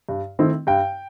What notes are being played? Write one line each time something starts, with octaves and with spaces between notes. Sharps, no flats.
G2
D#3 A3 C4 E4
G2 G5